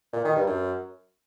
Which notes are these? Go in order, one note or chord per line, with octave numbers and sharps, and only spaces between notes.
A#2
D#3
G2
F#2